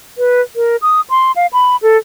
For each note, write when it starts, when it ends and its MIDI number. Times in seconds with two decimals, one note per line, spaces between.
0.18 0.41 71
0.56 0.76 70
0.82 1.01 87
1.10 1.32 84
1.36 1.47 77
1.53 1.77 83
1.82 1.98 69